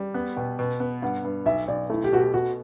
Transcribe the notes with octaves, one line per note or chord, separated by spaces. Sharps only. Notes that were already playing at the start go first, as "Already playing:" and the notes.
Already playing: G3
B3
B2 G5
B2
B3
G2 F#5
G2
B1 E5
B1 D5
A3 E4
G4
B2 F#4
G4
B2 F#4